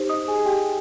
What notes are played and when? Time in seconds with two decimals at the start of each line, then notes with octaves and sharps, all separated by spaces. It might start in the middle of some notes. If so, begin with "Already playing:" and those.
Already playing: D#4 G4 C5
0.09 D#5 D#6
0.28 G#4 G#5
0.46 G4 G5